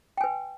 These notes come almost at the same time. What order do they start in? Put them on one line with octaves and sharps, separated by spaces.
G5 G#5 B4